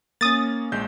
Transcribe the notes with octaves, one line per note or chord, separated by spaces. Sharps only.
A#3 C#4 D#6 A6
A#1 G#3 G6